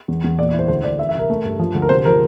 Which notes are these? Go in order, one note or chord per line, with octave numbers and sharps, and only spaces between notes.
E2
E2
A#2 D5
D5
E4 C5
D2 C5
D2 D5
E3 E5
E5
C2 A#4
A3
G2
F3
D2
A#4
C3 C5
F3 A#4